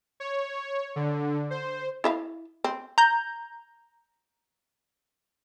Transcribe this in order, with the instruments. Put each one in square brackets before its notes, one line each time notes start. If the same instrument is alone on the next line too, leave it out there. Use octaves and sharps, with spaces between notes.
[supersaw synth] C#5
D3
C5
[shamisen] E4 E5 F5
C4
[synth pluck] A#5 G6